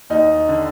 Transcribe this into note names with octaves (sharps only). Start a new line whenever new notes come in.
D#2 D#4
D3